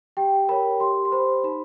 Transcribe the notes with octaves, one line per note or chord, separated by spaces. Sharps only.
G4 G5
A#4 C#5 B5
G4 C6
C6
C5 B5
D#4 B5